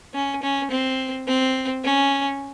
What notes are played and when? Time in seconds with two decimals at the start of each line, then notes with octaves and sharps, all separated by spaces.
0.14 C#4
0.42 C#4
0.71 C4
1.28 C4
1.84 C#4